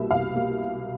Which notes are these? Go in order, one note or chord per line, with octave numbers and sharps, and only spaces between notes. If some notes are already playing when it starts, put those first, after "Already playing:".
Already playing: C2 B2 G3 A#3 E5
C2 F5
B2 G3 A#3